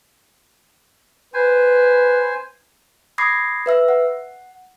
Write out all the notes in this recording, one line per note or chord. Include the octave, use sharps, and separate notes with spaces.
B4 C5 G#5
B5 D6 D#6 G#6 A#6 C7
B4 E5 E6
F#5